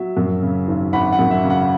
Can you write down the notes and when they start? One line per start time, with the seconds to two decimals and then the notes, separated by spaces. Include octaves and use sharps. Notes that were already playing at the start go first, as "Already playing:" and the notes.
Already playing: F#3 E5
0.17 F#2
0.43 C#3
0.68 G#1
0.93 G#1 F#5 B5
1.12 F#5
1.19 F#2
1.31 E5
1.44 C#3
1.50 F#5